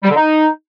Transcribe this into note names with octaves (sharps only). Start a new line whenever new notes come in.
G3
D3
D#4